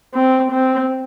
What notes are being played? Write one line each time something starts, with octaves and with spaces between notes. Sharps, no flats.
C4
C4